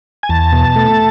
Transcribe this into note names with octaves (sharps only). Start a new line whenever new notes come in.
G#5
E2 A5
B2
A3